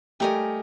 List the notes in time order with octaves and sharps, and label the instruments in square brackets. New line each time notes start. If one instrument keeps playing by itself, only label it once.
[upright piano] G3 A3 [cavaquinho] G4 A#4 D#5 G#5